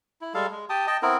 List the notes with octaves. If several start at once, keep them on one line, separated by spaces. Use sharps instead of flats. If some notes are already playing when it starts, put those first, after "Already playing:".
E4
G3 G#3 A4 F5
G#3
G4 G5 A5 D#6
D#5 G5 A5
B3 C4 E4 A#4